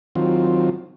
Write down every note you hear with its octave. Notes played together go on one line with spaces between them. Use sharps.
D#3 F#3 C4 F4